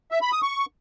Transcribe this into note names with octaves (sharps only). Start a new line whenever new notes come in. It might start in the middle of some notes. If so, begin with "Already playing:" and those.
E5
B5
D#6
C#6